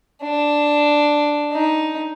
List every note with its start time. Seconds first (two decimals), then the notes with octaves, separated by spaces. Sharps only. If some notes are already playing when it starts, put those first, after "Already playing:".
0.22 D4
1.52 D#4